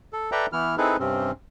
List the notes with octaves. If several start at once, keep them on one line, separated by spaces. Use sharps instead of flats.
A4
A4 B4 D5 E5 G5 A#5
E3 B3 E4 F6
C4 D#4 E4 G#4 A4 B4
G2 C3 C4 C#4